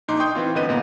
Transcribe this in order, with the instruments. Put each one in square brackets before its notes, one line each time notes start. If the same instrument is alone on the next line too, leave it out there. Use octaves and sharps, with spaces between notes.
[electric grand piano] A#1 D#4 C6 D6
G5 C6 C#6 D#6 G6
E3 C4 F4
G1 D3 B4 D#5 D#7
E2 A#2 B3